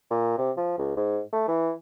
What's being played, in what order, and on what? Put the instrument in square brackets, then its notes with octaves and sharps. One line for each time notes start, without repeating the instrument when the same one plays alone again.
[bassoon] A#2
C3
F3
C#2
G#2
A3
E3